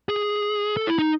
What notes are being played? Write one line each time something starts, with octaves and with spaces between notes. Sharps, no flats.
G#4
A4
E4
D#4